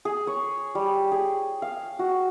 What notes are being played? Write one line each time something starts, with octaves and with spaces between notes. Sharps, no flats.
G#4
C#5
G3
G#4
F5
F#4